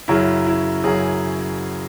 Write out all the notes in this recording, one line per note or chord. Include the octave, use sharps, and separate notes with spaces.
F#2 C#3 F#3 E4
E4
F#2 C#3 F#3 G#4